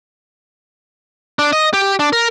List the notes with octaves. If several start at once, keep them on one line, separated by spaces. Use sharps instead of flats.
D4
D#5
G4
D4
A#4